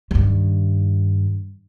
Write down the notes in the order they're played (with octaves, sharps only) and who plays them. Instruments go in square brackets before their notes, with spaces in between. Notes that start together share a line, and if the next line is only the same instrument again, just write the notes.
[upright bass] G2 D#3